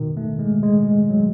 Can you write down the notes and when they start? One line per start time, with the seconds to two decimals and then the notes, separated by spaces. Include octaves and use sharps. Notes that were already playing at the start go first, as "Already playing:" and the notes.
Already playing: B2 D#3
0.17 A3
0.39 G#3
0.63 G#3
1.09 F#3